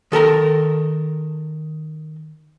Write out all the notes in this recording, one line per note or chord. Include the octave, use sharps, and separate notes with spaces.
D#3 A4 A#4 A#5